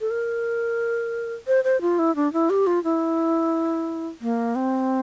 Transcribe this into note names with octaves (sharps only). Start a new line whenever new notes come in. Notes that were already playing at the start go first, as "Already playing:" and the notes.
A4
A#4
C5
C5
F4
E4
D4
E4
G4
F4
E4
A#3
C4